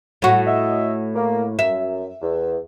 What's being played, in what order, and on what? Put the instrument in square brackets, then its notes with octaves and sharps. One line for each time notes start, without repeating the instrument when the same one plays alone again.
[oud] A2 F#4
[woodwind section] D#5 E5
A#3
[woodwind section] F#2 [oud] E5
[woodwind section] E2